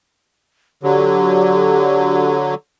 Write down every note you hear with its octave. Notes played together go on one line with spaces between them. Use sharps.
D3 F#3 G4